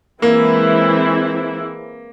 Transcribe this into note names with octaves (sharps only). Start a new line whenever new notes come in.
E3 G#3 A#3 C4 E4